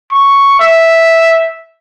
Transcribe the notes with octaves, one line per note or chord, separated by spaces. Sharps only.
C#6
E5